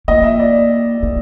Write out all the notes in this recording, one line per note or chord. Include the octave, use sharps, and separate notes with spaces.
A#3 D#5
E5
D5
A#3